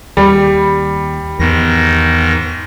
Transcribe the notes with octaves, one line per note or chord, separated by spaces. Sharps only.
D#2 G3
E2 G#2 D#3 B3 A#6